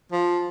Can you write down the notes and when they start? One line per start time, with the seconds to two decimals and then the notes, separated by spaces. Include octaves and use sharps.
0.12 F3